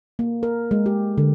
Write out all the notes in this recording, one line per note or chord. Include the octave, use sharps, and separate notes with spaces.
A#3
A#4
G#3
G4
D3